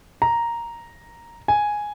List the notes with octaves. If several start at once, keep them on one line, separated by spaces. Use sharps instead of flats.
A#5
G#5